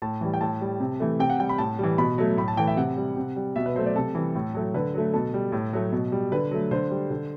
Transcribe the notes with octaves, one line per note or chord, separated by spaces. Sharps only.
A2 A5
E3 G3
G5
A2 A5
G3
C3
E3 A3
C3 G5
F#5
G3 G5
B5
A2 A5
E3 G3
B2 B5
F#3 A3
A2 B5
A5
E3 A3 G5
E5
C3 F#5
G3
C3
G3
B2 E5
B4
F#3 A3 C5
D5
C3 A4
E3 G3
A2
F#3 A3
D3 B4
F#3 A3
B2 A4
G3
A2
F#3 A3
B2
G3
D3 B4
F#3 A3
D3 C5
G3
D3